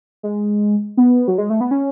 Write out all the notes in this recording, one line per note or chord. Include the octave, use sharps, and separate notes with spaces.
G#3
B3
F#3
G#3
A3
B3
C#4